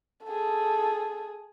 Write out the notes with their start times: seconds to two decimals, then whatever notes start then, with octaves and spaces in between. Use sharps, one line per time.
0.25 G#4 A4